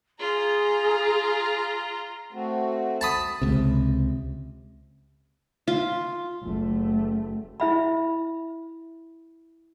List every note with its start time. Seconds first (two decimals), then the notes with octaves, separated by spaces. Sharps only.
0.20 F4 G#4 A#5
2.33 A3 C4 F#4
3.01 A5 B5 D#6
3.42 C#2 C3
5.68 F4
6.43 F#1 A3
7.60 E4 E5 B5